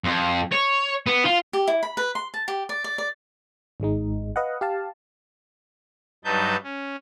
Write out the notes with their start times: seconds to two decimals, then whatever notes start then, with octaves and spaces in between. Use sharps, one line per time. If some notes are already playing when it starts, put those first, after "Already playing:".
0.04 F2
0.52 C#5
1.07 B3
1.25 F4
1.53 G4
1.67 E4
1.83 B5
1.97 B4
2.15 C6
2.34 A5
2.48 G4
2.69 D5
2.84 D5
2.98 D5
3.80 G#1 G#2 G#3 D#4
4.36 B4 D#5 F5 F#5
4.61 G4 F5 A5
6.25 G2 F#3 D#4 B4 A5 G6
6.63 C#4